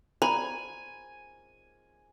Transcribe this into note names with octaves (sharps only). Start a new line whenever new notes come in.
G#5 A#5 B5